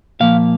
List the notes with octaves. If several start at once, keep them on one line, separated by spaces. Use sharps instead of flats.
A#2 F3 A#3 F5